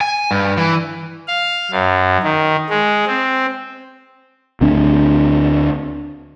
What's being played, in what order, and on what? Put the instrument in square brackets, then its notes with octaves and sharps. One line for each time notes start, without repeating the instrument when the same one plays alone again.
[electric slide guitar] G#5
G2
E3
[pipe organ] F5
F#2
D#3
G#3
C4
[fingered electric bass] D2 C4 D4